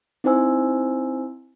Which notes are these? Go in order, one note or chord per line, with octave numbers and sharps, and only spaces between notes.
C4 D#4 E4 C5 G#5 E6